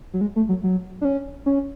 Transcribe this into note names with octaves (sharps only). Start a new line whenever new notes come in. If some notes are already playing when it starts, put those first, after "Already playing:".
F#3
G#3
A3
F#3
F#3
D4
C#4
C#4